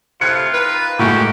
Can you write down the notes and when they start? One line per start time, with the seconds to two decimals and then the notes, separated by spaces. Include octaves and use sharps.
0.21 A2 C3 F4 F#6 G#6 C#7
0.52 D#3 B4
0.99 A2 G#3 A#3 F#4 G4